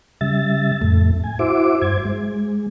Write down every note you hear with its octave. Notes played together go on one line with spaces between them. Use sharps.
C#3 G3 E5 A6
F2 A2 A3
G#5
E4 F#4 C5 E5 D6
G2 C5 G#6
G#3